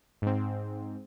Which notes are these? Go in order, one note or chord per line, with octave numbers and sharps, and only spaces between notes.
G#2 C4